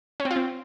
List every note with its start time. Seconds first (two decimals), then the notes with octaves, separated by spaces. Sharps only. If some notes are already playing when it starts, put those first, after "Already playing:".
0.20 C#4
0.25 C4
0.31 F4
0.36 C4